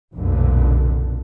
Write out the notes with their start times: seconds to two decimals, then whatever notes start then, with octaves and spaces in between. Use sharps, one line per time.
0.16 F1 B1 F#2 A#2 D3